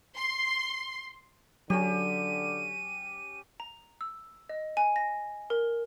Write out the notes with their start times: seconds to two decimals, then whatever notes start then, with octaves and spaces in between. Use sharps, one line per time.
0.16 C6
1.70 D3 F#3 C#4 G4 D#7
3.60 A#5
4.01 E6
4.49 D#5
4.77 G#5
4.96 A#6
5.50 A#4